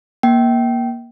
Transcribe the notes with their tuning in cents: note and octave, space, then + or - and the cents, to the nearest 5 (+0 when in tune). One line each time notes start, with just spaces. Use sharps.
A#3 +20 G5 -20